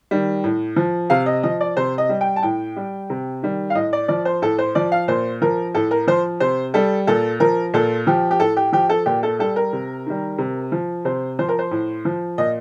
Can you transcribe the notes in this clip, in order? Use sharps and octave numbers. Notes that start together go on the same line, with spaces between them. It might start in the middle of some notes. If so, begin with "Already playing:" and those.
D#3 G3
A2
F3
C3 F5
D#5
F3 D#5
D5
C3 C5
D#5
G3
G5
A5
A2 G5
G3
C3
D#3 G3
F5
A2 D#5
D5
F3 D5
C5
A2 A4
C5
F3 D5
F5
A#2 C5
F3 A#4
A2 A4
A#4
F3 C5
C3 C5
G3 A4
A#2 A4
F3 A#4
A#2 A4
F3 G4
G4
A2 A4
G4
F3 G4
A4
A#2 G4
A4
G3 A4
A#4
C3
D#3 G3
C3
F3
C3 C5
F3 C5
A#4
C5
A2
F3
A#2 D#5